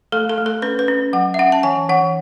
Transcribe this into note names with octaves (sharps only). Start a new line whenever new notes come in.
A3 A4
A4
A3
A4
C#4 B4
B4
C#4
F#3 F#5
E5
C#4 F#5
A5
E3 G#5
E3 F#5